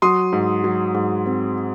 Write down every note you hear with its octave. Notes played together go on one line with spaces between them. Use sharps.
F#3 C6 D#6
G#2
F#3
G#2
C4